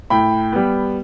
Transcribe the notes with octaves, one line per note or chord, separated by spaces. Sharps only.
A2 G5 B5
G3 B3